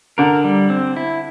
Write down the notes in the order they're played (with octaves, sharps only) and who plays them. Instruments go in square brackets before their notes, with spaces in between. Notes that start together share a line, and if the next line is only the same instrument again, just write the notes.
[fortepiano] D3 [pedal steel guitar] A#4
[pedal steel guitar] G3
C4
E4